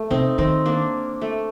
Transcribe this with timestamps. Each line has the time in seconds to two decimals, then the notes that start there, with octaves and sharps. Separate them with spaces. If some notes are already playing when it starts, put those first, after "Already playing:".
Already playing: A3
0.10 C3 C4 D#4
0.38 D#3 C4 D#4
0.66 A#3 D4
1.22 A3